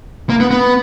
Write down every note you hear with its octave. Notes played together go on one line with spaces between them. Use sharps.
A#3
B3
B3